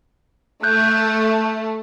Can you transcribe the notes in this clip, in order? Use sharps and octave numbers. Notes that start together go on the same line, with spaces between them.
A3 F#6 G6